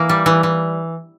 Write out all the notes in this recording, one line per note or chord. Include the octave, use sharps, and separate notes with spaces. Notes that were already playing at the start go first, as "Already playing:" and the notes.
Already playing: E3 A#3
G3
E3
E3